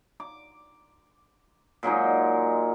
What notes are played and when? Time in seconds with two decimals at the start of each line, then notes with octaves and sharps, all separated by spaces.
0.20 D6
1.83 A#2 F#3 G#3 D#4